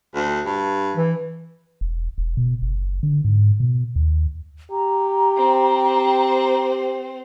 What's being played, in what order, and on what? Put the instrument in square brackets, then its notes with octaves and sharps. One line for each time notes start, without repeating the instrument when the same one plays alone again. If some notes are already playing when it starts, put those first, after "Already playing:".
[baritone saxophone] D2
G2
[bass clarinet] E3
[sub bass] E1
E1
B2
F#1
D3
G#2
B2
D#2
[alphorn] G4 [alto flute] A#5
[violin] C4 C5